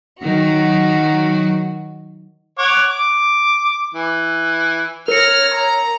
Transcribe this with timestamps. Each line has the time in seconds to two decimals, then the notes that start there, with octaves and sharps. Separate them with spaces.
0.21 D#3 F#3 F#4
2.58 C#5 F#5 D6
2.90 D6
3.94 E3
5.08 A#4 C#5 F6 A#6 C#7
5.54 A#5